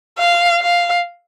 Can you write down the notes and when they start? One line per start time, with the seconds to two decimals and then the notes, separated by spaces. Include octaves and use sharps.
0.19 F5
0.62 F5